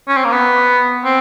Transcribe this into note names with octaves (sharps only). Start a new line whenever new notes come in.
C#4
C4
A#3
B3
C4